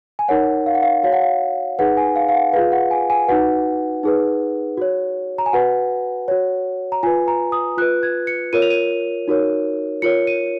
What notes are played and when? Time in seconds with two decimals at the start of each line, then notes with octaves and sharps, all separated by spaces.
0.19 G#5
0.28 D#4 A#4 C#5 F#5
0.66 F5
0.75 F#5
0.82 F5
1.04 F#4 C#5 F5
1.13 F#5
1.22 F5
1.79 D#4 G#4 B4 F#5
1.97 G#5
2.16 F5
2.29 F5
2.35 F#5
2.53 F4 G#4 B4 F5
2.72 F#5
2.91 G#5
3.10 G#5
3.28 D#4 F#4 B4 F#5
4.03 D#4 G#4 B4
4.78 F#4 C#5
5.38 A#5
5.46 G#5
5.53 F#4 B4 F#5
6.28 F#4 C#5
6.92 A#5
7.03 F4 B4 G#5
7.28 A#5
7.52 D#6
7.77 F4 B4 F#6
8.03 G#6
8.27 C#7
8.53 F4 A#4 C#5 D#7
8.62 F7
8.70 D#7
9.28 D#4 F#4 A#4 C#5
10.02 F4 A#4 C#5 C#7
10.27 D#7